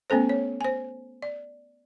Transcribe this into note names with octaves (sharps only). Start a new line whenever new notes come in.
A3 B3 C#4 A4 C5
C#5
C5 G#5
D5